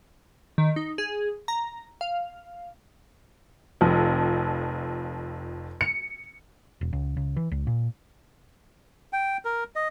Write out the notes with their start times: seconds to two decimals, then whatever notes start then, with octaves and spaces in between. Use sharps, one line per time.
0.58 D#3
0.76 D#4
0.98 G#4
1.48 A#5
2.01 F5
3.81 F1 F2 F3
5.81 C#7
6.81 E1
6.93 C#2
7.17 C#2
7.36 E3
7.51 C#2
7.67 A#2
9.13 G5
9.45 A#4
9.76 D#5